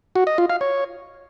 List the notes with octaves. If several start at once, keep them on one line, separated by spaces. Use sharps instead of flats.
F#4
D#5
F4
F5
C#5